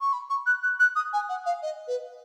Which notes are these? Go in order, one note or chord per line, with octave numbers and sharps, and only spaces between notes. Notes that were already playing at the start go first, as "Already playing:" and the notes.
C#6
B5
C#6
F#6
F#6
F#6
D#6
G#5
F#5
F5
D#5
B4